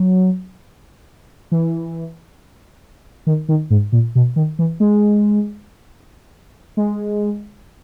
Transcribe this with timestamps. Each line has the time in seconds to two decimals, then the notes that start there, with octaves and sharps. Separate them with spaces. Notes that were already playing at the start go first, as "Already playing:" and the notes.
Already playing: F#3
1.51 E3
3.27 D#3
3.49 D#3
3.70 G#2
3.92 A#2
4.15 B2
4.36 D#3
4.59 E3
4.80 G#3
6.77 G#3